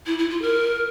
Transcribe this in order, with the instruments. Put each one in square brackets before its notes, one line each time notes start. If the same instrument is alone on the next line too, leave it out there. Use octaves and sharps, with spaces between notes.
[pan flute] E4
E4
F4
A#4